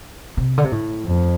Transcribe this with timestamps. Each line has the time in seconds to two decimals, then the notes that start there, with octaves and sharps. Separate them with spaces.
0.37 C3
0.58 D3
0.64 C3
0.72 A2
1.06 F2